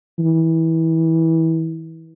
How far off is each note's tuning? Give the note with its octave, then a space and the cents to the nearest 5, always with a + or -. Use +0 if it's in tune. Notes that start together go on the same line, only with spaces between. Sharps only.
E3 -25